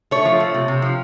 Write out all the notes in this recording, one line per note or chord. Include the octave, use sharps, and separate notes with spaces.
A3 C#5
F3
A3
C3
C3
F3